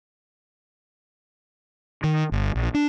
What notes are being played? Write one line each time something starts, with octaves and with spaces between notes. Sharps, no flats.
D#3
G1
A#1
D4